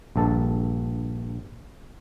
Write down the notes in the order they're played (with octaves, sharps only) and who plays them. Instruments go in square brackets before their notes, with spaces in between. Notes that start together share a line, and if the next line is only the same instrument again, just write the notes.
[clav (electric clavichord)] A#1 G2 A4 A5